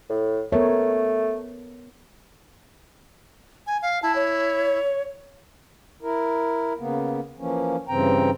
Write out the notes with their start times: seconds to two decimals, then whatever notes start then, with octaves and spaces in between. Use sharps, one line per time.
0.10 A2
0.52 A3 B3 A#4 C#5
3.67 G#5
3.82 F5
4.03 E4 A5
4.16 C#5
6.03 E4 A#4
6.79 C#3 A#3 B3
7.38 E3 F3 A#3 C#4
7.88 G2 C#3 E3 C4 G5 A#5